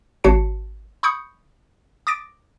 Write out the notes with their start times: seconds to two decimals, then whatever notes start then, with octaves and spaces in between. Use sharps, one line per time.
0.24 G#1 F#4 C#5 A5 C7 C#7
1.03 B5 C#6 D#6 G6 C#7
2.07 D6 D#6 A6 A#6 D7